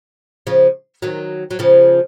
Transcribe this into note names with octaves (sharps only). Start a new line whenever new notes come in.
C#3 F3
D#3 F#3
F#3
C#3 F3